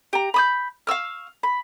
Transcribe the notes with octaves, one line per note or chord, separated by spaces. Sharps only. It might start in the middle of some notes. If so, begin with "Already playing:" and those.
G4 A#5
B5 D#6 G6
F5 C#6 E6 F6
B5